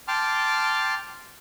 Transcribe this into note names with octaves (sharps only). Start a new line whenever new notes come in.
G5 A5 C6 D6 F6